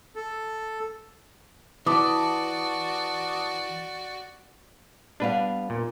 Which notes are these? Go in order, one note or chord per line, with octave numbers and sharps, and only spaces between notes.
A4
E3 F#4 D5 A5 D6 D#6
G3 B3 D4 B4 F5
A#2